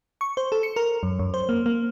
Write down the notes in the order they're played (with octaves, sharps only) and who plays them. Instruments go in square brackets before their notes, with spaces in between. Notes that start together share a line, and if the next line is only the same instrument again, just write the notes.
[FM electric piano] C#6
C5
A4
C#7
A#4
F#2
F#2
C5
A#3
A#3